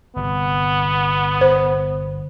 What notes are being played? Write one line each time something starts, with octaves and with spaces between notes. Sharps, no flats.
G1 C3 B3
C5